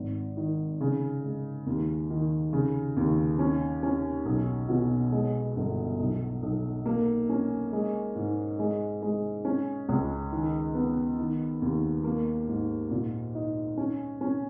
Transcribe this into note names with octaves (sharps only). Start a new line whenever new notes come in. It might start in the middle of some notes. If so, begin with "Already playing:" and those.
Already playing: G#1
D#3
C#3
G#3
D#2
D#3
C#3
D#2
C#4
C#4
B1
B2
G#3
G1
B1
B1
A#3
C#4
G#3
G#2
G#3
G#3
C#4
C#2
D#3
B3
D#3
D#2
A#3
G#2
A#2
D#4
C#4
C#4